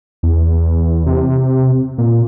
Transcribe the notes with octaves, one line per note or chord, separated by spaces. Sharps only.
E2
C3
A#2